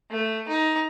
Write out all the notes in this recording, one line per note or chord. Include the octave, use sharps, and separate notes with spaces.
A3
D#4